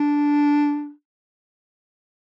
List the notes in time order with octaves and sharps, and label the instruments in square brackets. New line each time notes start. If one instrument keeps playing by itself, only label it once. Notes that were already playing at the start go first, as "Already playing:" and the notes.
Already playing: [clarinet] D4